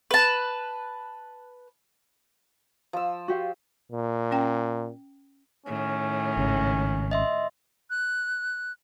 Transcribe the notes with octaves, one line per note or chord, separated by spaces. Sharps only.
B4 A5
F3 E6
F#4 G4 F5
A#2
C#4 G5
A2 D#3 C#4
G#1 C#3
D#5 E5 C6
F#6